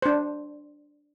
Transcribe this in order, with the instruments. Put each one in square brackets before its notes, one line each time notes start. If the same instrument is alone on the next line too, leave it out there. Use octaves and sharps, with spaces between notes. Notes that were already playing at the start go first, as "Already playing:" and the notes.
[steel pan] D4 C5